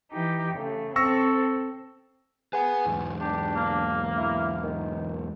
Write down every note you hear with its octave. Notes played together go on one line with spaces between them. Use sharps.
E3 D#4 G4
C#3 A3
C4 A4 C#6 E6 A#6
G#4 B4 F#5
E2 G#2
D4 G4
A#3
E4
D#3